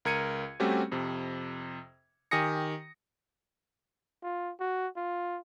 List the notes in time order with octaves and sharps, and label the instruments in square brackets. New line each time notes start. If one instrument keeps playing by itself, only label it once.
[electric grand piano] C#2 A#4 G#6 C#7 D#7
G3 A3 C4 C#4 F#4 G4
F2 C3
D#3 G4 G#5 D#6 A#6 C#7
[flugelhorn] F4
F#4
F4